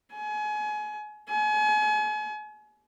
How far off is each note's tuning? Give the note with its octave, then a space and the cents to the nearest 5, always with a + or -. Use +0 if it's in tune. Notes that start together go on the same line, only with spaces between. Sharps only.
G#5 +30
G#5 +35